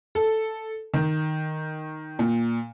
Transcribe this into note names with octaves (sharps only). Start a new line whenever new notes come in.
A4
D#3
A#2